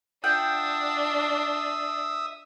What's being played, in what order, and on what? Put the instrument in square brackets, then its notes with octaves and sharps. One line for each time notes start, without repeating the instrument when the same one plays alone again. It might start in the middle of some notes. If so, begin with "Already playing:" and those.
[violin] D4 [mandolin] F4 F#5 G5 [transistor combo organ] E5 D#6